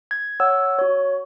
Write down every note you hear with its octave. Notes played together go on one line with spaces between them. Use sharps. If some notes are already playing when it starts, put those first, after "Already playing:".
G#6
C#5 F#5 E6
F#4 C#5